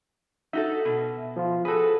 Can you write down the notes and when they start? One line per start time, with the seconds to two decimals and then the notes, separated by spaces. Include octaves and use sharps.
0.53 D#4 F#4 A4 E5
0.85 B2
1.36 F3 F4
1.65 F#4 G#4 A4 B4